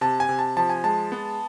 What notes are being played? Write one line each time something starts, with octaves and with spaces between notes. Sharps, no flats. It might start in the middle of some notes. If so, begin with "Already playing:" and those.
C3 A5
G#5
C3
A5
F3 A5
G#5
G#3 A5
B3